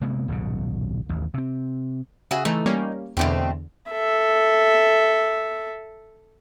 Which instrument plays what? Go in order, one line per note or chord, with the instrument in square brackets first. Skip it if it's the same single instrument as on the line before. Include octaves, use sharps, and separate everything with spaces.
[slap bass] C3 G#3 A#3 B3
D#1 B1 G#2 C#3
A1 D#2
C3 C4
[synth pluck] C#3 [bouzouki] F#4 G#4 E5
[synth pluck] E3 A3 [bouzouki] D#4
[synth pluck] G3 A#3 C#4
[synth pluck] E2 D3 [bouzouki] B2 A3 C4
[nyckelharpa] A4 E5